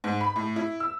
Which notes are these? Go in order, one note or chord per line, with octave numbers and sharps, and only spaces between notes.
G#2
B5
A2
E4
E6